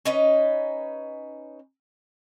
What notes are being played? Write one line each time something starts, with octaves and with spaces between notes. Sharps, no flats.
C#4 D#4 B4